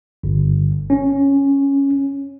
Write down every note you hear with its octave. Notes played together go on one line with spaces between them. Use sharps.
G1
C#4